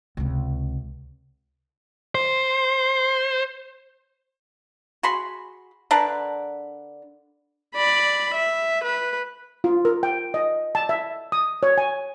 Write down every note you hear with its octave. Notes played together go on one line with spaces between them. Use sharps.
C#2 C3
C5
F#4 G#4 B5 C6
D3 D4 A#4 B4
D5 B5
E5
B4
F4
A#4
G5
D#5
A5
E5
D#6
C#5
G#5